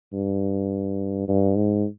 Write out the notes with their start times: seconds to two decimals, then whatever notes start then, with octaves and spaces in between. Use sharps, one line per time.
0.13 G2
1.28 G2
1.55 G#2